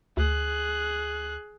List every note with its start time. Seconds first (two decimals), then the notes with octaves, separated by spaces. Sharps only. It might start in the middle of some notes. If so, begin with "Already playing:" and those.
0.17 D2 G#4 F#6